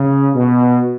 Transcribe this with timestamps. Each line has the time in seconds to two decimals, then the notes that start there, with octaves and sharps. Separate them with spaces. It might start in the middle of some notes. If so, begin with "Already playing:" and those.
Already playing: C#3
0.35 B2